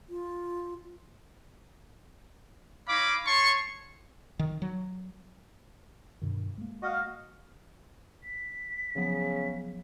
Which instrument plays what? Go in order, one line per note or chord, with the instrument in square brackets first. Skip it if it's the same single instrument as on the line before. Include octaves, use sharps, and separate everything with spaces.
[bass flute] F4
[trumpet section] D#4 C#5 F5 B5 D6
C#5 A5 C6 C#6
[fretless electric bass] D#3
F#3
G2 B2 D#3
G#3 A#3
[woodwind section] F#4 D#5 F5
[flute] B6
[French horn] C#3 [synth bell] F3 F#3 B3